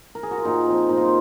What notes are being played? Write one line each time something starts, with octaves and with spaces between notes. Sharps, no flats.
A#4
G#4
F#4
F4
A#2 D#4
F3 C4
A#2 D#4
F4
D#4